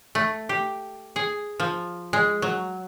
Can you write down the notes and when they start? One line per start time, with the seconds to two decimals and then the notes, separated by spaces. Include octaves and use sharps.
0.15 A3
0.49 G4
1.16 G#4
1.60 F3
2.13 G#3
2.42 F#3